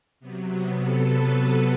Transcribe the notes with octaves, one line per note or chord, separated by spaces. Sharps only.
C3 F#3 B3
B3
A4
B4
A4